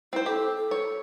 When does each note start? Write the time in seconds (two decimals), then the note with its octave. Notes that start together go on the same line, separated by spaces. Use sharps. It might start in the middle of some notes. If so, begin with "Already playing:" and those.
0.13 C4 E4 C5
0.26 G4 A4
0.57 A4
0.71 C#5